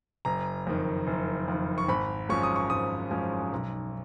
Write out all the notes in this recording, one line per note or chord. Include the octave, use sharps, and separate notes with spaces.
F#1 A#5
F2 D#3
F#1
F2 D#3
C#6
G#1 B5
F#2 F3 G#3 C#4 C#6
D#6
C#6
G#1 D#6
F#2 F3 G#3 C#4
B1